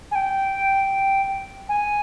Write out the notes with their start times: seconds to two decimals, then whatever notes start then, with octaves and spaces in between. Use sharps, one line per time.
0.11 G#5
0.15 G5
1.69 G#5